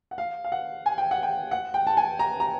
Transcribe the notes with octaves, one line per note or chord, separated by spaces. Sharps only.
F#5
F5
F5
F#5
G#5
G5
F#5
G5
F#5
G5
A5
G#5
A#5
A#5